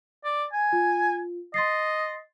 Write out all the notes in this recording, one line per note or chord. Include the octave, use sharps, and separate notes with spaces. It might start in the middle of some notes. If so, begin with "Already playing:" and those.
D5
G#5
F4
D#5 C6 A6 C7